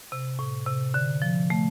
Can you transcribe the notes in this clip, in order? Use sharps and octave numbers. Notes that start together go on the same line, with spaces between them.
C3
A2
C3
D3
F3
A3